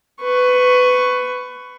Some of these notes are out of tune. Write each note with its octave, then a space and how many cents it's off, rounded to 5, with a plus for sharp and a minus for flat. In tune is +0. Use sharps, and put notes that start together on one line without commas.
B4 +20 C#6 +0